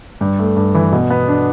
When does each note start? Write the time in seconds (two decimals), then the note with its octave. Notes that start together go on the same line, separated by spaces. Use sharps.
0.21 G2
0.39 A3
0.57 G2
0.75 E3
0.93 B2
1.10 B3
1.28 D4